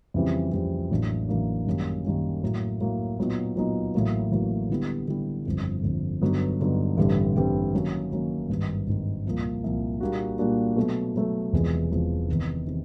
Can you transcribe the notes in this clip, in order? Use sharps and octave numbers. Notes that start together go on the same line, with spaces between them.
F2 C#3 E3 G3 C4
F2 C#3 E3 G3 C4
A1 A2 F#3 A#3 D4
A1 A2 F#3 A#3 D4
F#2 D#3 G3 A#3 C#4
F#2 D#3 G3 A#3 C#4
A2 F#3 A#3
A2 F#3 A#3
A#2 F#3 B3 D#4
A#2 F#3 B3 D#4
A1 A2 F#3 A#3
A1 A2 F#3 A#3
D3 G3 B3 E4 G4
D3 G3 B3 E4 G4
G1 F2 D3
G1 F2 D3
G2 D3 F#3 B3 D#4
G2 D3 F#3 B3 D#4
A1 G2 D3 G3 C4
A1 G2 D3 G3 C4
D#3 F#3 A#3 C#4
D#3 F#3 A#3 C#4
G#1 G2 D#3
G#1 G2 D#3
C2 A#2 F3 A#3
C2 A#2 F3 A#3
A#2 G3 A#3 D4 F#4
A#2 G3 A#3 D4 F#4
B2 F#3 A3
B2 F#3 A3
E1 E2 C3 F3 G#3
E1 E2 C3 F3 G#3
E2 C3 D#3
C3 D#3